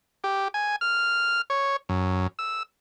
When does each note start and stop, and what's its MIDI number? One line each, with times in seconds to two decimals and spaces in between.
0.24 0.48 67
0.54 0.76 80
0.81 1.41 89
1.50 1.76 73
1.89 2.27 42
2.39 2.63 88